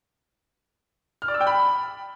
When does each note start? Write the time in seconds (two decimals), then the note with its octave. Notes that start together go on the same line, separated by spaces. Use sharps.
1.22 F6
1.28 D5
1.34 E6
1.41 G5
1.47 B5